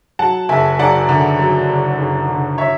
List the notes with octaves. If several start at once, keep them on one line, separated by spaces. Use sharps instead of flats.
F#3 F#5 A5
F#1 E5 G#5
F#2 D5 F#5
D3
F#3
F#1
F#2
D3
C#5 E5